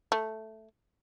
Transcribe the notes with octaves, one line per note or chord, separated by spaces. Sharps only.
A3